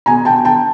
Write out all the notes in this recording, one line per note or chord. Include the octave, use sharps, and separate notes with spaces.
B2 G#5 A#5
G5 A5
G5 A5